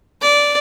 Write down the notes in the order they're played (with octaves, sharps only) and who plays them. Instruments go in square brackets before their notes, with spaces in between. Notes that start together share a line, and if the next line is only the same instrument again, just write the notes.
[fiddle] D5